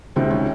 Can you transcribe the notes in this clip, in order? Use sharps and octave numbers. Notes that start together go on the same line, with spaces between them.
C#2 C3 D#3 C4
C#4